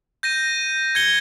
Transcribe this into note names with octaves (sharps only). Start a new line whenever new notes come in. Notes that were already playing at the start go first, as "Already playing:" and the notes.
G6 A#6 D#7
G#6 C#7 G7